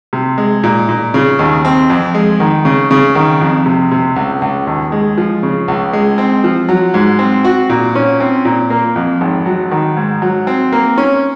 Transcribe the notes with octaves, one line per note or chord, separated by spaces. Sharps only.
C3
G#3
A#2
A#2
C#3
D#2
C4
F2
G#3
D#3
C#3
C#3
D#3
F2
C3
C3
C#2
C#2
D#2
G#3
F3
C#3
C#2
G#3
C4
F3
F#3
G#2
C4
F#4
A#2
C#4
C4
A#2
A#3
F2
G#1
F#3
D#3
G#2
F#3
C4
A#3
C#4